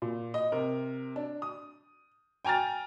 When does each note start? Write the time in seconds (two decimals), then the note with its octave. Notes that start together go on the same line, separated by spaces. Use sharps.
0.02 A#2
0.34 D#5
0.52 C3 A#4
1.16 D4
1.42 D#6
2.45 G5 G#5 A#5 F6 A6